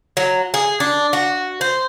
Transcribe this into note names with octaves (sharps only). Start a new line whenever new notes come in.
F#3
G#4
D4
F#4
C5